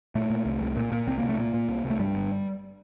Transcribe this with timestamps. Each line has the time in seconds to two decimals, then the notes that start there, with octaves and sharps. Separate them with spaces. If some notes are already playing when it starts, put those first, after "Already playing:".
0.15 A#2 A3
0.30 A#2
0.45 C2
0.61 C2
0.77 A#2
0.92 A#2
1.07 C2 C4
1.18 C2 A#3
1.29 A3
1.38 A#2 A#3
1.54 A#2
1.68 C2
1.84 C2
1.90 A3
1.99 G2 G3
2.15 G1